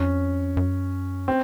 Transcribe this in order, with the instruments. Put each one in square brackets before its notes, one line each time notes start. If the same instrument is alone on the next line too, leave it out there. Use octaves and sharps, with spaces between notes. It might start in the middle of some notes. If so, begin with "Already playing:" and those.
Already playing: [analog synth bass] F2 [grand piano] C#4
[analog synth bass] F#2
[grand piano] C4